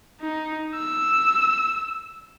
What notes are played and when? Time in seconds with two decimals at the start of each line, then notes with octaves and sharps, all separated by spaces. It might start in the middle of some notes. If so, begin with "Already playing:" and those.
0.21 D#4
0.76 E6